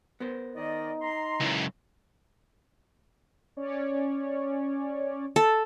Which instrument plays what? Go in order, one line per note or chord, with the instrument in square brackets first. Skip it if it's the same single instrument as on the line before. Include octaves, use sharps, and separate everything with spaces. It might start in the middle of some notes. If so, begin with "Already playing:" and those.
[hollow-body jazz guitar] B3 A#4 C5
[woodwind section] D#3 D5 D#5 [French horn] D#4
[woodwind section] A#5 C6
[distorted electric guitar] C#2 F#2 [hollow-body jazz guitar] E4
[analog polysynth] C#4 C#5 D5
[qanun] A4